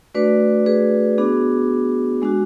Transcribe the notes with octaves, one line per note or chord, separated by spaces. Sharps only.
A3 D4 F#4 B4 D5
G#4 B4
B3 D4 F#4 G#4
G#3 D4 F#4